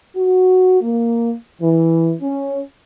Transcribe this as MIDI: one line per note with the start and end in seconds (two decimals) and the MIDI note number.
0.15 0.81 66
0.81 1.32 58
1.60 2.12 52
2.21 2.60 61